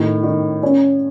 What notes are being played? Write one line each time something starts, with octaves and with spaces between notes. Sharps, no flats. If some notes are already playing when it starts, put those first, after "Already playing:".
Already playing: A2 D#3
D#3
C#4